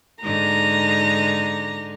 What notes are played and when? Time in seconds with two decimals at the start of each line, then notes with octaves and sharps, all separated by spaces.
0.23 G#2 D3 D#4 A#5